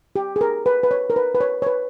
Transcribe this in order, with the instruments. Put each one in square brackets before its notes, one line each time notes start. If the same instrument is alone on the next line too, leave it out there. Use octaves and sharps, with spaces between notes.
[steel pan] G4
G#4
A#4
B4
B4
C#5
A#4
B4
B4
C#5
C#5
B4